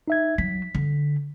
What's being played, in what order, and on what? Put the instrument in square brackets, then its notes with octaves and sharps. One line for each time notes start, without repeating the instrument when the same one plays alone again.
[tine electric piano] D#4 E5 G#6
[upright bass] F#3 [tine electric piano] B6
[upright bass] D3